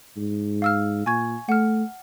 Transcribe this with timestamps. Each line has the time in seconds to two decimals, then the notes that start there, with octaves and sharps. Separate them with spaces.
0.17 G#2
0.62 F5 E6 F6
1.06 A#2 G#5 C#6 G#6
1.49 A3 F#5 F6